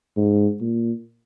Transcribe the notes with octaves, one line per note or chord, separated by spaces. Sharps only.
G#2
A#2